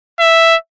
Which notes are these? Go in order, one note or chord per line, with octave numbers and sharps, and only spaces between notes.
E5